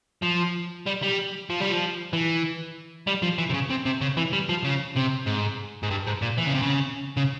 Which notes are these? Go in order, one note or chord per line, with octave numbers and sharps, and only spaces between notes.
F3
G3
G3
F3
G3
F3
E3
G3
F3
E3
C3
C#3
C3
C3
C#3
E3
G3
F3
C#3
C3
G#2
G#2
G2
G#2
A#2
E3
C#3
C3
C#3
C#3